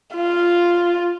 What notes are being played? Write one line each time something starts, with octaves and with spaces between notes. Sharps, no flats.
F4